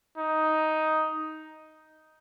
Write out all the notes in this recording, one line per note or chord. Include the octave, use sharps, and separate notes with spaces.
D#4